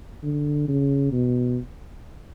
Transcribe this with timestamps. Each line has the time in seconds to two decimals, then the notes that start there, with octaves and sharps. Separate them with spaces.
0.23 D3
0.68 C#3
1.12 B2